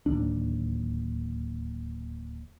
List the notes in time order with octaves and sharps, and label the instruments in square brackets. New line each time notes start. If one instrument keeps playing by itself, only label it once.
[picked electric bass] D1 G1 D#2 D4